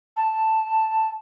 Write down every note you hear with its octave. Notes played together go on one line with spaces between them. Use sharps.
A5